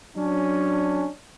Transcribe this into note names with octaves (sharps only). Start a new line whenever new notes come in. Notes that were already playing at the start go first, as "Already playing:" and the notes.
F#3 C#4 D4